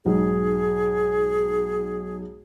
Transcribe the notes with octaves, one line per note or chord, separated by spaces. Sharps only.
B1 G#2 G#4